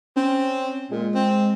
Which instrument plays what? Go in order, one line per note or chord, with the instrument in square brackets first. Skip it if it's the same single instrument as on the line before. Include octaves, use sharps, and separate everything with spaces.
[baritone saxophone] C4 [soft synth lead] C#4
[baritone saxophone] A#2 [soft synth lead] G#3
[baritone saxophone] C4